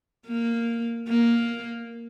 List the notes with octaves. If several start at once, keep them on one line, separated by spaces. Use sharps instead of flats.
A#3
A#3